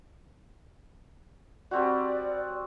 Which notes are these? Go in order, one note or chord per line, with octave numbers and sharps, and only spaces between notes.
G3 C4 F#4 D5